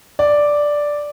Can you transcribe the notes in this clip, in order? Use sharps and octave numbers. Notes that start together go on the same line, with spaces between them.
D5